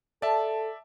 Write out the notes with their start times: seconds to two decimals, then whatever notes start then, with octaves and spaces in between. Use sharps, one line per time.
0.22 A4 D5 E5 A5